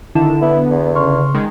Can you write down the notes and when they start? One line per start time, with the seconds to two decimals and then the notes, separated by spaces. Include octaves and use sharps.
0.15 D3 D#3 E4 A5 E7
0.42 B3 E4 B4
0.70 E2
0.95 C#3 C6 C#6 F6
1.35 D#3 G#3